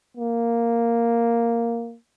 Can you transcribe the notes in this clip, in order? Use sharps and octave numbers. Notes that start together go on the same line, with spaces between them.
A#3